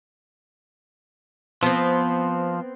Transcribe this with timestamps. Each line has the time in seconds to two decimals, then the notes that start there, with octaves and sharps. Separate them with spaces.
1.63 F3 B3 C4